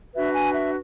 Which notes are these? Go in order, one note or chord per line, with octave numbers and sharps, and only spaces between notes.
D4 F#4 B4 E5
G#5
E5